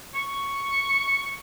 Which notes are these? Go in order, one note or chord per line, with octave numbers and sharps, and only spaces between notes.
C#6